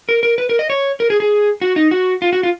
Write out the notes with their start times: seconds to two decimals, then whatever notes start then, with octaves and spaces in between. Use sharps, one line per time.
0.09 A#4
0.23 A#4
0.38 B4
0.49 A#4
0.59 D#5
0.70 C#5
1.00 A#4
1.10 G#4
1.20 G#4
1.62 F#4
1.76 D#4
1.91 F#4
2.22 F4
2.33 F#4
2.43 F4